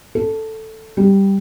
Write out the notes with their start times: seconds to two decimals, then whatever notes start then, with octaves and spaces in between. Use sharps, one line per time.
0.15 A4
0.97 G3